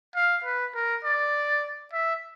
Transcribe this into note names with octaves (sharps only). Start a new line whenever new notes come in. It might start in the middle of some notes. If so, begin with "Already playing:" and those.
F5
B4
A#4
D5
E5